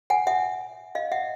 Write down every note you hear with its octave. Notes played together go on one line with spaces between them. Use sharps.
F#5 G#5
E5 F#5
D#5 F5
E5 F#5